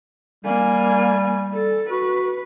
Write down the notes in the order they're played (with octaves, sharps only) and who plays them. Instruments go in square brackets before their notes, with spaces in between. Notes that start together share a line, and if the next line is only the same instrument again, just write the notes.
[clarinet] G3 [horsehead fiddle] A#3 G#5
[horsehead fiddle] A4
[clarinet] F#4 [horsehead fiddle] B4